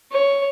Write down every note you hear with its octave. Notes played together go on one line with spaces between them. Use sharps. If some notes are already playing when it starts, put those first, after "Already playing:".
C#5